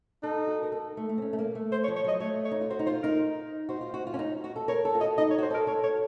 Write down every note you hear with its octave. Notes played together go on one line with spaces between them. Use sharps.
D#4 A4
F#4
A#4
A4
A3
A3
C4
C#4
A3
A#3
A3
C5
C#5
F3
C#5
F#3 D#5
A3 C#5
C#5
D#4
F4
F#4 C5
D#4
F4 C5
D#4 A#4
F#4 C5
F4
F#4
F4
C#4
D#4
F#4
A4
A#4 C#5
A4
F4
F#4 D#5
D#4 D#5
C#5
F#4 C5
A4 A#4
A4 C#5
F#4 C#5